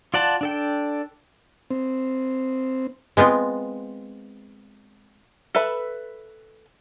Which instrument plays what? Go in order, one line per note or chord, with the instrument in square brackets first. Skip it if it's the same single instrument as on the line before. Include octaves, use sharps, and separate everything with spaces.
[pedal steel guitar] F4 D5 F#5 A5
D4 A4 G5
[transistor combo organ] C4
[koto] G#3 B3 C4 F4
[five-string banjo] A4 B4 E5 B5